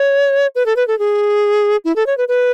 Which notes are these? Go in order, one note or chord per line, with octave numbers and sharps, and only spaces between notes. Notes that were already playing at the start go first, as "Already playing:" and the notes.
Already playing: C#5
B4
A4
B4
A4
G#4
E4
A4
C#5
B4
B4